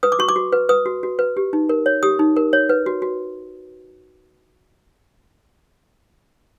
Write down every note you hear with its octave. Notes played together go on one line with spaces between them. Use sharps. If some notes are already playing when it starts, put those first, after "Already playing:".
B4 D#6
D6
F#4 C#6
D6
F#4
B4
B4 D#6
F#4
F#4
B4
G4
D#4
A#4
C#5
G4 D#6
D#4
A#4
C#5
B4
F#4
F#4